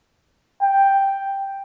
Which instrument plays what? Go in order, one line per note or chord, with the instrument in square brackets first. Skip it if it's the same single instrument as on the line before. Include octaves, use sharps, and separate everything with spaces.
[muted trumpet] G5